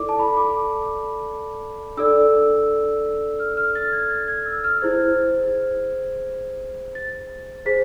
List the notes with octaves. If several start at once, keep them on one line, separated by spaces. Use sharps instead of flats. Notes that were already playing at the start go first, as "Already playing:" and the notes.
Already playing: E4 A4 D5 D6
A5
B5
D6
D4 A4 D5 E6
F6
F6
A6
G#6
A6
G#6
E6
F6
E4 G#4 C5 G#6
A6
G#4 C5 B6